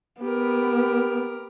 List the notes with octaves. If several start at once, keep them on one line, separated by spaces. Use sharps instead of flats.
B3 G4 A#4